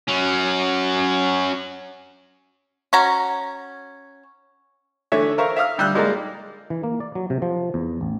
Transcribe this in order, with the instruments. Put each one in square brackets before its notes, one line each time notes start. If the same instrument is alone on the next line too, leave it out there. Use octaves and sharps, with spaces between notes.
[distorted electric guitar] F#3 C#4
[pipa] C#4 F#4 A#5
[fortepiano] D3 E3 A3 C#5 E5
A#4 C5 E5 F5 C#6
E5 F5 D#6 F6
D2 G3 E6 F#6
G3 G#3 A#3 D#4 D5 A#5
[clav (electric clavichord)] E3
A#3
D5
F#3
C3
F3
E2
A1